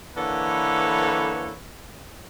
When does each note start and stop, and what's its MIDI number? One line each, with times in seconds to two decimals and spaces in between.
0.16 1.55 50
0.16 1.55 52
0.16 1.55 58
0.16 1.55 69
0.16 1.55 71
0.16 1.55 73